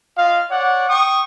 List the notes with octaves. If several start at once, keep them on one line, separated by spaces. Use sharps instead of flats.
F4 D#5 F5
C#5 D5 F#5
G5 C#6 D#6